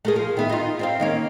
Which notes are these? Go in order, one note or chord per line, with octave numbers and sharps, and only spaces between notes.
A3 A#3 G#4
F3
D#3 B3 E5
D#4 F4
C4 C5 F5
D#3 A#3 C#4